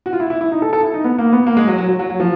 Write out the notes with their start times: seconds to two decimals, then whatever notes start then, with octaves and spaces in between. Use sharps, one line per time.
0.06 F#4
0.13 F4
0.20 E4
0.30 E4
0.41 E4
0.52 D#4
0.62 A4
0.73 A4
0.83 E4
0.94 D#4
1.04 B3
1.18 A#3
1.32 B3
1.47 A#3
1.57 G#3
1.68 F#3
1.78 F#3
1.88 F#3
1.99 F#3
2.10 F#3
2.20 F3